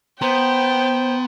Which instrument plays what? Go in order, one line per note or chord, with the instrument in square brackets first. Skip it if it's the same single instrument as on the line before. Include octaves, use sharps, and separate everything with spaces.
[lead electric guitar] B3 [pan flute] C5 [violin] G5 [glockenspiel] A#5 C6